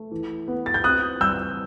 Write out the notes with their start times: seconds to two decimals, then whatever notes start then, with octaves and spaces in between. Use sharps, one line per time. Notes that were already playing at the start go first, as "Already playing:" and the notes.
Already playing: A3
0.11 E3
0.48 B3
0.66 A6
0.74 G6
0.84 C4 D#6 F#6
1.21 G3 E6 G6